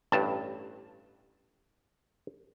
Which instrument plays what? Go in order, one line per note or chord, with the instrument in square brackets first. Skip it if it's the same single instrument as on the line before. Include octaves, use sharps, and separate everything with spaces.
[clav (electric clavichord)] A1 G2 A5